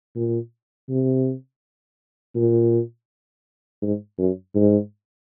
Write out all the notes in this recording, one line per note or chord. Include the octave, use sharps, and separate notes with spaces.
A#2
C3
A#2
G#2
F#2
G#2